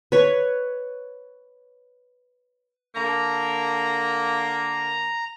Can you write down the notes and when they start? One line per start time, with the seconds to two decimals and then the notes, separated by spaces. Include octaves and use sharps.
0.12 B4 C#5
2.95 D3 A#3 A#5